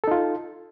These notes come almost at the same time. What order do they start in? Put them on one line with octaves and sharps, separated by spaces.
A4 D#4 F4